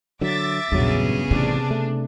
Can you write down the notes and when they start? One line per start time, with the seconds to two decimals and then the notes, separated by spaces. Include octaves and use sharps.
0.21 D3 F#3 E5 D6 A6
0.72 A#1 E2 G2 C#3 F#3 B3 G#4
1.31 A1 C3 D4
1.71 A3